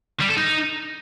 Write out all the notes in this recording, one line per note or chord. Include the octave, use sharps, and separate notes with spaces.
G3
A4
D#4